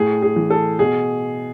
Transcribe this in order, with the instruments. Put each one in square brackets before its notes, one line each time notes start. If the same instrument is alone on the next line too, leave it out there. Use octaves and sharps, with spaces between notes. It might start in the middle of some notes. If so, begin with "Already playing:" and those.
Already playing: [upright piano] A2 G#4
G#4
E3
A4
B2 G#4